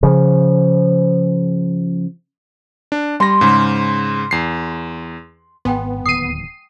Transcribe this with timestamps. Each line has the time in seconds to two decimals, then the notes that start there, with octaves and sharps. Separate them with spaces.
0.03 C#3 F3
2.92 D4
3.20 G3 C6 A#6
3.41 G#2 C#3
4.31 E2 C7
5.65 G#1 B3 G5 G#5 C6
6.06 D1 D#2 D#6 C7 D#7